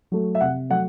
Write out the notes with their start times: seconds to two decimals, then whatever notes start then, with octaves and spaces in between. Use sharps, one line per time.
0.12 F#3 A3
0.35 E5
0.41 C3 F#5
0.69 F#3 A3 F#5